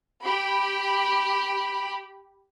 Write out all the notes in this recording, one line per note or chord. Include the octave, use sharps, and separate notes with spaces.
G4 B5